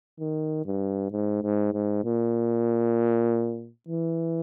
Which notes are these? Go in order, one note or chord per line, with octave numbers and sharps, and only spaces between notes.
D#3
G2
G#2
G#2
G#2
A#2
E3